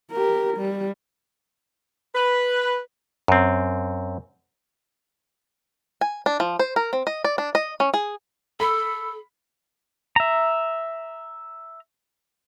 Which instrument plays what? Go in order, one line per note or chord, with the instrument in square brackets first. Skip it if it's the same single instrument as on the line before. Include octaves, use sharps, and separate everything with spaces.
[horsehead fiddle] G4 A#4
G3
[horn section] B4
[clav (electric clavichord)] F#2 C4
[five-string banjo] G#5
D4
F3
C5
A#4
C4
D#5
D5
D4
D#5
C#4
G#4
[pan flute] A4 [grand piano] B5
[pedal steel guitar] E5 A#5